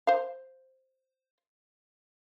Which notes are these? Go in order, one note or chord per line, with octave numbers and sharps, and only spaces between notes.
C5 F5